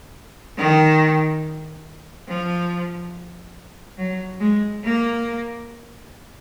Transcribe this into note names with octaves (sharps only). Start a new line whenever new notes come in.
D#3
F3
F#3
G#3
A#3